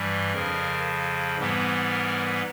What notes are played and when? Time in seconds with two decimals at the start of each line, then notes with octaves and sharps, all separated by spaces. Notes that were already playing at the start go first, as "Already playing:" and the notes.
Already playing: G2 E3 G3
0.33 F2 C#3 F3 A#4
1.38 G#2 E3 G3 B3
1.90 A#4